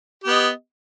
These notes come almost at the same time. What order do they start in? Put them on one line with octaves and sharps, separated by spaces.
G4 B3 D#5